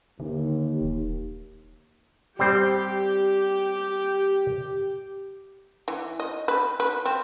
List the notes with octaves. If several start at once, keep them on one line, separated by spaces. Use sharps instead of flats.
D#2 D3
D#1
G3 C4 G4 C5
E3
D#5
B4
B4
C4